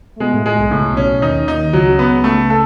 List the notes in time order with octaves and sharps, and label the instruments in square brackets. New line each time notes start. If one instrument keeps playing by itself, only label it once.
[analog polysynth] A3
[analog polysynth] B2 B3 [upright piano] G#3
[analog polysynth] A2 A3
[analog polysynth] A2 A3 [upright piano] G#3
[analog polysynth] B1 B2
[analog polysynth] C#2 C#3 [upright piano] A2
[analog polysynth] B1 B2
[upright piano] C#4
[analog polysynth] B1 B2
[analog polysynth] D#2 D#3 [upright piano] D#4
[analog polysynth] D#2 D#3 [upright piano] D#4
[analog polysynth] C#2 C#3 [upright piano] F#3
[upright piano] B3
A3
A4